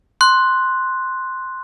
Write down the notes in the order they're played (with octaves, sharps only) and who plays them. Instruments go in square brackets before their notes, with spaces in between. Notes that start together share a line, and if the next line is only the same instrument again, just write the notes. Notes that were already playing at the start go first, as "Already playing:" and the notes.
[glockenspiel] C6 F#6